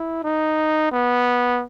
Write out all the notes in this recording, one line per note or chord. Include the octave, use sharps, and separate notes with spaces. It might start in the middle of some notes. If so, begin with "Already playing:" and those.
Already playing: E4
D#4
B3